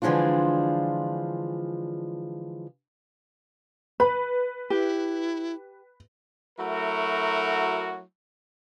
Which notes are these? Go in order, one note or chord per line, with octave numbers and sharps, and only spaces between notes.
D3 E3 F3 G#3 D4 F4
B4 B5
E4 G4
F#3 A3 E4 F#4 A#4